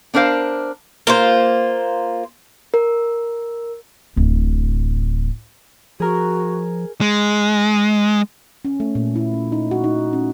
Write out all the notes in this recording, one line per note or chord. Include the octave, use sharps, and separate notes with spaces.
B3 D4 A#4 C5 F5
A#3 F4 C5
A#4
D1 A1
F3 F#4 G#4 A#4
G#3
C#4
A3
A#2
E4
C#4
D#4
F#4
D#4
C#4